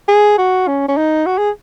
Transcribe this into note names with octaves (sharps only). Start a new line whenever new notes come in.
G#4
F#4
C#4
C#4
D#4
F#4
G#4